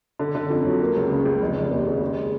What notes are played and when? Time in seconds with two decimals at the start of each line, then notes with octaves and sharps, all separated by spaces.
0.19 D3
0.35 D3
0.50 F2
0.65 F#3
0.80 A#3
0.95 C#2
1.10 C#3
1.25 C#2
1.41 F1
1.56 F1
1.71 D#2
1.87 C#3
2.01 G#3